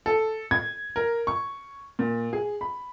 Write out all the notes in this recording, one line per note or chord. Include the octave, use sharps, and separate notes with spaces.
A4
G#6
A#4
C#6
A#2
G#4
B5